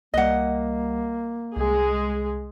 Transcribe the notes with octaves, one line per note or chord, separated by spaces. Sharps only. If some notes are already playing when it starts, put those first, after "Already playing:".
C2 G3 A#3 D#5 F#5
C2 G#3 G#4